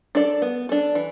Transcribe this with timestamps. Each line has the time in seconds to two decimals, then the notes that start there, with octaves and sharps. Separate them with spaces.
0.15 D4 A4 D5
0.42 B3
0.69 D4 A4
0.95 E3